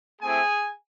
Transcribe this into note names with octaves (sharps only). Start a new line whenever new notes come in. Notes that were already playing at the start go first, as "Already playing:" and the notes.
A3 C4 E4 G#4 G#5